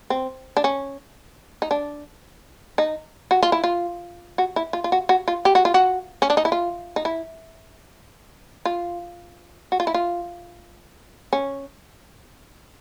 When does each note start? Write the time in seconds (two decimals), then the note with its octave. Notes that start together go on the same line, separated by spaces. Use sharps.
0.10 C4
0.57 D4
0.64 C#4
1.62 D#4
1.71 D4
2.78 D#4
3.31 F#4
3.43 F4
3.52 E4
3.64 F4
4.38 F#4
4.56 E4
4.73 F4
4.84 F4
4.92 F#4
5.09 F#4
5.28 F4
5.45 G4
5.55 F#4
5.65 F4
5.74 F#4
6.22 C#4
6.30 D4
6.37 D#4
6.45 E4
6.52 F4
6.96 D#4
7.05 E4
8.65 F4
9.72 F#4
9.80 F4
9.87 E4
9.94 F4
11.33 C#4